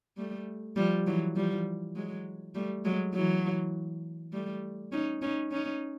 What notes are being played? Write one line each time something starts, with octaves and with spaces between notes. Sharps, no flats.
G3 A3
F3 G3
E3 F#3
F3 G3
F#3 G#3
G3 A3
F#3 G#3
E3 F#3
G3 A3
C#4 D#4
C#4 D#4
C#4 D#4